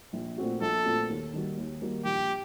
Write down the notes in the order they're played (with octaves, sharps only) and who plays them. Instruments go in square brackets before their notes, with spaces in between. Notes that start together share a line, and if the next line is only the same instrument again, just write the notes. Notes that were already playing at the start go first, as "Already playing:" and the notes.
[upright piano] A#1
A#2 A3 C4 F#4
[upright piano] A#1 [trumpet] A4
[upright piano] A#2 A3 C4 F#4
D#2
D#3 G3 A#3 F#4
D#2
D#3 G3 A#3 F#4
[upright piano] A#1 [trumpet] G4